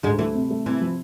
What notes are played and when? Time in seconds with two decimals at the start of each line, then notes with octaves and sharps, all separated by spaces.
0.03 D2 G#2 G#3
0.19 E3 A3
0.35 C3
0.50 A3
0.66 C3 E3
0.81 F3